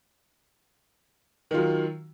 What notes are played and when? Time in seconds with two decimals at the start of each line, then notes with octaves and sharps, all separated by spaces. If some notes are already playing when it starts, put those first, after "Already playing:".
1.51 D#3
1.54 F4
1.58 F#3